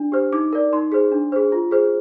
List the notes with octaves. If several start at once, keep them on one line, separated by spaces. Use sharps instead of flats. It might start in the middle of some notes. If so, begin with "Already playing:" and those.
Already playing: D4
G4 C5
D#4 D6
A#4 D5
D#4 C6
G#4 C5
D4
G#4 C5
F4
G#4 C5